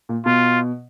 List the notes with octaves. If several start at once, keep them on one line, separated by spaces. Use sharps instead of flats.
A#2
B2 F4